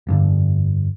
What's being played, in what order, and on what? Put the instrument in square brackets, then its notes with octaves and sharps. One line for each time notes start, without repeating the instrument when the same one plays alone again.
[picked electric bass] F1 G2 D3